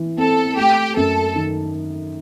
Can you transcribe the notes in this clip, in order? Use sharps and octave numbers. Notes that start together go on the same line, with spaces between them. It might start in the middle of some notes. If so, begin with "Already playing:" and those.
Already playing: E3
C4 A4
A3 G4
F#2 A4
D#3